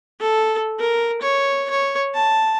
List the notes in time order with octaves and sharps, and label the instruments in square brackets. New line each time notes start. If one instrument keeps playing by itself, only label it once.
[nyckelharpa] A4
A#4
C#5
C#5
A5